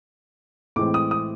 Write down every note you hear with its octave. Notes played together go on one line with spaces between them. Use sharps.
A2 E3 G#3 C4 D6
D#6
D#6